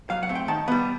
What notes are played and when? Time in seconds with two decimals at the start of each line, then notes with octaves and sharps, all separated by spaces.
0.10 F#3 F5
0.23 F#5
0.29 A3 C4
0.35 G5
0.48 D#3 A5
0.68 G3 B3